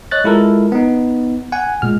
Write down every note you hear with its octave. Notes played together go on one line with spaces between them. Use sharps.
C#5 D#5 F#6 A6
G#3 E4 F4 A4 A#4
B3 D#4
F#5 G#5
A#2 G#3 F6